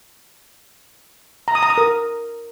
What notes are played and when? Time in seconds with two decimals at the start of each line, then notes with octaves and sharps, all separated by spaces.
1.48 A#5
1.55 D#6
1.63 A#5
1.70 D#6
1.78 A#4